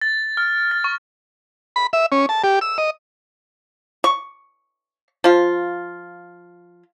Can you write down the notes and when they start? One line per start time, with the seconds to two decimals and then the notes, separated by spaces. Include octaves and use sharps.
0.01 A6
0.37 F6
0.71 A6
0.84 C#6
1.76 B5
1.93 E5
2.12 C#4
2.29 A5
2.44 G4
2.61 E6
2.78 D#5
4.04 C#6
5.24 F3 F4